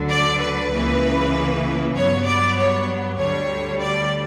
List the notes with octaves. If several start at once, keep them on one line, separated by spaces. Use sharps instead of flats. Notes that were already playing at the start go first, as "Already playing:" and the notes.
Already playing: D2 D3 F#3
D5
B4
C#2 C#3 E3 A#3
G2 F#3 B3 C#5
D5
C#5
D2 D3 G3 C#5
D5